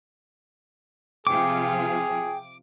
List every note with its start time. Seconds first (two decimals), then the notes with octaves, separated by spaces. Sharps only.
1.27 C3 F3 F4 G#4 G5 D6